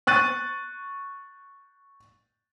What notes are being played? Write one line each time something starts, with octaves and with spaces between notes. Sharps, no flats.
C#6 F#6 A6 D#7